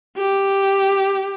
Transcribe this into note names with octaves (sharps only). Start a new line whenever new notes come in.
G4